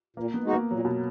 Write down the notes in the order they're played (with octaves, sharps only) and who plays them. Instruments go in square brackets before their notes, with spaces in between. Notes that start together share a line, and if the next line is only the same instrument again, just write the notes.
[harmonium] A#2 [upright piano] A#3
[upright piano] B3
[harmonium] G#3 D#4 F#4
[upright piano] A#3
[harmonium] A#2 [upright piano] F#3
[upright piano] B2